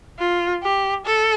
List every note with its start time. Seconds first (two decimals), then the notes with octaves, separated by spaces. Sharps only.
0.19 F4
0.63 G4
1.06 A4